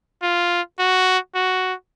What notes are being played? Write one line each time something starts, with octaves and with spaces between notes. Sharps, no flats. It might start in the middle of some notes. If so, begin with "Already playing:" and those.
F4
F#4
F#4